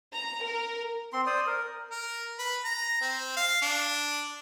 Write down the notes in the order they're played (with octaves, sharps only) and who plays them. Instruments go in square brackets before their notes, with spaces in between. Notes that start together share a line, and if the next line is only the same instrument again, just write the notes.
[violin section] A#5
A#4
[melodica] C4 C6
C5 D5 D#6
A#4
[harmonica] A#4
B4
A#5
C4
F5
D4